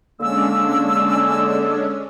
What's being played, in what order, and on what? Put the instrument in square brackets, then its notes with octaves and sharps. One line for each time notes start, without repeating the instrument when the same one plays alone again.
[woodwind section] D3 A#3 E6 [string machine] G#3 C#4 D4